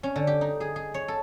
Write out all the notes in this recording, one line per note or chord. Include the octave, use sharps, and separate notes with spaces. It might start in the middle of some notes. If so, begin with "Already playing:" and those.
C#4
D3
G4
D#4
G#4
G#4
C#5
A4